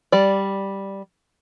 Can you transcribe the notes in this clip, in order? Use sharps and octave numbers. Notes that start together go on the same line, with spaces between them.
G3 D5